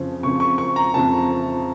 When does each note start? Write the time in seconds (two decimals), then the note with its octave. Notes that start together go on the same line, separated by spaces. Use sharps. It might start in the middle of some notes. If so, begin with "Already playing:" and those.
Already playing: F2 C#3 F3 C4
0.23 F2 C#3 F3 C4 C#6
0.40 C#6
0.58 C#6
0.76 A#5
0.94 F2 C#3 F3 C4 A5